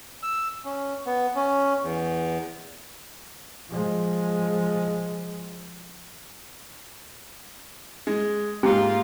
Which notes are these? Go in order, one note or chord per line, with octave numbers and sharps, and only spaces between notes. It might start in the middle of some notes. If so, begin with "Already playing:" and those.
E6
C#4
B3
C#4
E2
F3 G#3
G#3
G#2 A#3 F4 G4